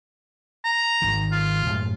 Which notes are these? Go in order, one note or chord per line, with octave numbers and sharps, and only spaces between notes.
A#5
G#1 D#3
F4
F#2 A2 G#3